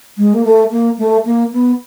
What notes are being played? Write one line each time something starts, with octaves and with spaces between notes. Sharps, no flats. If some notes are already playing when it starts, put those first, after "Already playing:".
G#3
A#3
A3
A#3
A3
A#3
B3